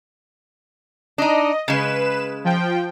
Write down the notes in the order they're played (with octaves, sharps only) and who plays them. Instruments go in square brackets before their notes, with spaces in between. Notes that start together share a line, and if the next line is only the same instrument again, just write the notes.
[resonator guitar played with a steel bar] D4 D#4 [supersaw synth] D#5
[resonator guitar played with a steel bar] C#3 G#3 [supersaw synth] B4 E7
[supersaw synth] F3 G5